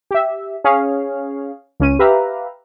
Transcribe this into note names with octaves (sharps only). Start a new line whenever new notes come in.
G4 E5
C#4 G#4 C#5 F5
C#2 C#4 D#7
G4 B4 E5 F5 A#5